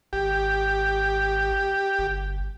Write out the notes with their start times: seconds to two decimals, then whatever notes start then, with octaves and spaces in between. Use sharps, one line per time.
0.13 G#1 G4
1.99 G1